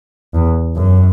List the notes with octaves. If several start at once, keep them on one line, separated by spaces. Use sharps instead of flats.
E2
F#2